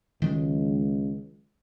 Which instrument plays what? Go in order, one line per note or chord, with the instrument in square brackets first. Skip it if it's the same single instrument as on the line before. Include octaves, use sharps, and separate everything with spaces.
[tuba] C#2 [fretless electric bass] D#3 F#3 G#3